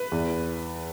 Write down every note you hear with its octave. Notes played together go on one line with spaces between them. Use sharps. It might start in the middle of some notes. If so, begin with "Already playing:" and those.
Already playing: B4
E2